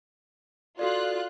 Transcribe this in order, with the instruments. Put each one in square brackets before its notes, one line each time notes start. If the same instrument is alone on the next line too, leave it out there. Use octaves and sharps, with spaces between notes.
[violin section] F4 F#6 [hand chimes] F#4 A4 D5